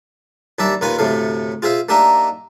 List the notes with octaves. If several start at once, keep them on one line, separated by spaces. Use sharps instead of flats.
D#2 G3 D4 D5 E5
D#2 A#2 F4 B4 G#5
D2 A2 C3 A3 F5
F4 G#4 C5 E5 F5
A#3 D4 D#4 G4 A#4 E5